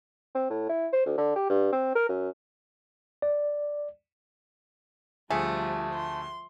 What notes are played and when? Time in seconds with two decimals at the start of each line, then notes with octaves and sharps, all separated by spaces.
0.35 C4
0.50 A2
0.69 E4
0.93 C5
1.06 D2
1.18 D3
1.36 G4
1.49 G2
1.72 C4
1.95 A#4
2.09 F#2
3.22 D5
5.30 D2 F3 G3 A3 G#4 G#5
5.95 C6